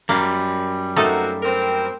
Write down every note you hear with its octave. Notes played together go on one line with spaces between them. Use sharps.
F#2 G3 A#3
A3 A#3 C4 D#4 F#4 A4
C4 A#4